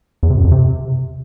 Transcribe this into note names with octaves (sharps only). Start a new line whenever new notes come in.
E2
C3
F#2
F2
C3